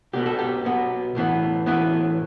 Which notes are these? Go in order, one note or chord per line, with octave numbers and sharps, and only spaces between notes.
B1 B2 B3 G4
A4
G4
B1 B2 B3
B1 A2 E3 B3
B1 A2 E3 B3